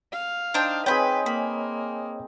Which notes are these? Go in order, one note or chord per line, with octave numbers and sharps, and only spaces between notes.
F5
D4 D#4 C5 G5
C4 G#4 B4 C#5 D#5 G5 G#5 B5
A#3 B5